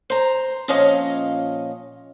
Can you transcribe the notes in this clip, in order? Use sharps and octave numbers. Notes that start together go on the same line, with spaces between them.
C5 A#5
A#2 F3 C#4 C#5 D#5 F5